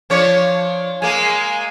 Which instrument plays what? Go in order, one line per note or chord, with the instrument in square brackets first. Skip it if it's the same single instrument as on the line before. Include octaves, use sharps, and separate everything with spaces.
[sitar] F3 D4 C#5
[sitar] G#3 A#3 [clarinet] G#5